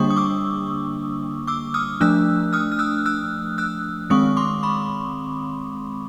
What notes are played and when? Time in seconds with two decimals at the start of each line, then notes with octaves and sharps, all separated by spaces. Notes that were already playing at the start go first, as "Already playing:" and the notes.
Already playing: D3 G3 A#3 D4 C#6 D#6
0.10 D#6
0.17 D6 E6
1.47 D6 E6
1.74 D#6 F6
2.01 F3 A3 D4 E6 F#6
2.53 D#6 F6
2.72 F6
2.79 E6 F#6
3.06 E6 F#6
3.58 E6 F#6
4.10 D#3 G#3 C4 C#6 D#6
4.37 C6 D6
4.63 B5 C#6